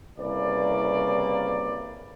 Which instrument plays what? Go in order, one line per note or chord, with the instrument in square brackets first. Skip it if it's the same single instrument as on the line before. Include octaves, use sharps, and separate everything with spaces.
[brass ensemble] C2 C#3 A#3 B4 D5